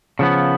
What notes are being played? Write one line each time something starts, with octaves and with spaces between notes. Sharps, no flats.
C#3 F3 B3